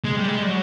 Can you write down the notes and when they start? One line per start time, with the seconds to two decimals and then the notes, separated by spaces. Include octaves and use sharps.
0.04 G#3
0.16 G3
0.28 G#3
0.42 G3
0.47 F#3